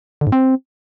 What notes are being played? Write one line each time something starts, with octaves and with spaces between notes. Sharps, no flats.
D3
G#2
C4